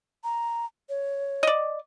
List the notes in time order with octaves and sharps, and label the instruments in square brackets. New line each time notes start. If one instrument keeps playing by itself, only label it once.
[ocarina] A#5
C#5
[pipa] D5 D#5